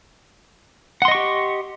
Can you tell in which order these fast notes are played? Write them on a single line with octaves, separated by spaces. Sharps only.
F#5 C6 D#5 C#6 G4